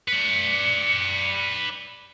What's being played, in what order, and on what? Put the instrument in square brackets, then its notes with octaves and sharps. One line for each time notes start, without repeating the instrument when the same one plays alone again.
[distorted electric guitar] B4 D5 [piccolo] C#7